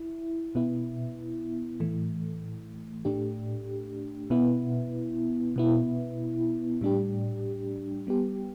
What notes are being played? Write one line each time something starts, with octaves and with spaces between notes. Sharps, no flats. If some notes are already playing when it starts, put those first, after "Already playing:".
Already playing: E4
B2 B3 E4
A2 E3 A3
A2 A3 D4 G4
B2 B3 E4
B2 B3 E4
A2 G3 D4 G4
G3 B3 G4